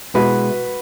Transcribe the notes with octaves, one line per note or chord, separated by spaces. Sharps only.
B2 G#3 B3 E4 F#4 B4